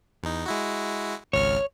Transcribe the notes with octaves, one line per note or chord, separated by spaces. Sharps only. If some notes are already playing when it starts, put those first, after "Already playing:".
E2 D#4
G#3 E4 F#4
G#1 C#2 C#5 F6